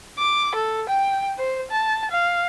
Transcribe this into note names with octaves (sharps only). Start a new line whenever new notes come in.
D6
A4
G5
C5
A5
F5